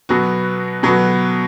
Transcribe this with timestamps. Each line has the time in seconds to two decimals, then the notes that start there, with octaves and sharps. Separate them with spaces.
0.09 B2 F#3 B3 F#4
0.83 B2 F#3 B3 F#4